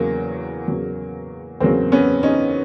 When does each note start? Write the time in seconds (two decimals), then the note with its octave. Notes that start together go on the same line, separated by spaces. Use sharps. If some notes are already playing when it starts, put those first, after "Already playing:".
Already playing: E2 C#3 F#3 A#3
0.68 E2 C#3 F#3
1.60 E2 C#3 F#3 A#3 C4
1.92 B3 C#4
2.23 C#4 D#4